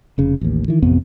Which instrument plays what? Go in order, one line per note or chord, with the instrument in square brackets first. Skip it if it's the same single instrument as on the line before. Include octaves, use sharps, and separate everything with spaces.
[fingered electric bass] F1 C#3
A1 D#2
D#3 E3
A1 F2 C3 B3